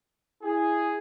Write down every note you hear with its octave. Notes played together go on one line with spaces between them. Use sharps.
E4 G#4